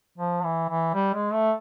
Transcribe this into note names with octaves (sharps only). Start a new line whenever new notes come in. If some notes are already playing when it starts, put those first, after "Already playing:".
F3
E3
E3
G3
G#3
A3